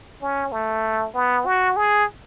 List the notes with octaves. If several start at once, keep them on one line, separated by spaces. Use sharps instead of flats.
C#4
A3
B3
F#4
G#4